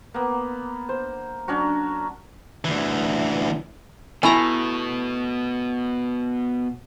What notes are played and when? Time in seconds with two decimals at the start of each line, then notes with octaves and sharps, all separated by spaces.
0.14 A#3 B3
0.89 C5
1.48 F#3 C#4 D4 F#4
2.65 D2 E3
4.23 B2 A3 E4 G#5 A#5